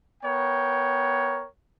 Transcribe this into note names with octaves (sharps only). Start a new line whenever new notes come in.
B3 A#4 C#5 G5